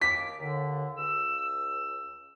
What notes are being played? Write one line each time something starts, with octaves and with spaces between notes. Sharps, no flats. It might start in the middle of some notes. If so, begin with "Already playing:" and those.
D#2 D6 B6
D#2 D3
C#2 E6